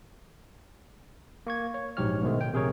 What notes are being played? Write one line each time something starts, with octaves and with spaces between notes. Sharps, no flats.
A#3 C#6 G#6
C#5
A#1 G#2 F#3 G4 C#5 F6
G#2 B2 D#3 G#3 A3
G5
A#1 C3 G#4 A#4 C#5